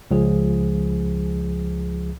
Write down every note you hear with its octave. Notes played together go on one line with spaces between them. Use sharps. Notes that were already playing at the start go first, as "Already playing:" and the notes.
C#2 F3 G#4